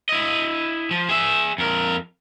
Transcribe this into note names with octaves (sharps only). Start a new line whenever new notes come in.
E4 D#5
F3
G#4 E5
F2 A#4